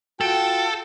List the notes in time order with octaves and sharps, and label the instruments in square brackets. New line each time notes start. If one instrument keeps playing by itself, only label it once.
[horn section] F4 F#4 G5 [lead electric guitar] A4